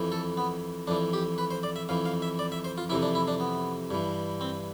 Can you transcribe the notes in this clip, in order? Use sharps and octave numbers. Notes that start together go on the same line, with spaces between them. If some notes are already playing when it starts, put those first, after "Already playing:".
Already playing: F2 E3
A4
B3
F2 E3 D4
G4
B4
C5
D5
E5
F2 E3 F5
F5
E5
D5
E5
C5
F4
F2 C3 E3 E4
D4
E4
D4
B3
G2 E3
C4